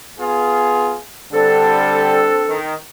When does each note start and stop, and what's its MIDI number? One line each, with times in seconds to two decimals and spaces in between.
0.19 0.96 59
0.19 0.96 65
0.19 0.96 68
1.33 2.32 50
1.33 2.32 55
1.33 2.58 60
1.33 2.58 62
1.33 2.58 69
2.49 2.75 51